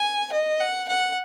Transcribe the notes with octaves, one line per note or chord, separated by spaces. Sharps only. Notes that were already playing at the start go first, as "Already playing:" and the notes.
Already playing: G#5
D#5
F#5
F#5